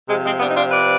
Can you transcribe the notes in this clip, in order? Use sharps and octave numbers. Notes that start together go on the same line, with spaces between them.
C3 F3 G#3
G#3 C4
B3 D4
D#4
D4 F4
B4 D5